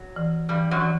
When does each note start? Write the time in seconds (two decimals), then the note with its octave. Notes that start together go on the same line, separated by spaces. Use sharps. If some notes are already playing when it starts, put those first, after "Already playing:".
Already playing: F#3
0.16 E3
0.49 G2 E3 G3
0.71 F#2 F#3
0.82 E3